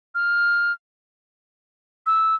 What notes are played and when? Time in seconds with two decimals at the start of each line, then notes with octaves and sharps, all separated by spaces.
0.15 F6
2.06 E6